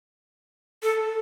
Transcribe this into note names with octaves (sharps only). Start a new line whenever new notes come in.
A4